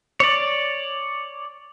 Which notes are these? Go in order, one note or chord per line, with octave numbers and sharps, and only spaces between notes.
C#5 D5